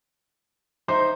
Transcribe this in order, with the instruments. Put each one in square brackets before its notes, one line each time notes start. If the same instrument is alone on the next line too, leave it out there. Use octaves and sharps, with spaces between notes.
[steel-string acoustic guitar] D#4 C5 E5 [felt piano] C6